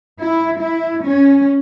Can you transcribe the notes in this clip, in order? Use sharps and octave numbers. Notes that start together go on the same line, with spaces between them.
E4
E4
C#4